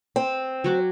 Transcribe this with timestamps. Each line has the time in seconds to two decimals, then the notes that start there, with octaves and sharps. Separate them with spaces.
0.16 C4
0.64 F#3 F#4 D6